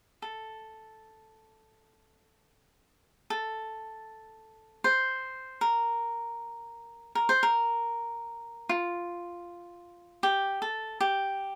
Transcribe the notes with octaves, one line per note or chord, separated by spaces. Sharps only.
A4
A4
C5
A#4
A#4
C5
A#4
F4
G4
A4
G4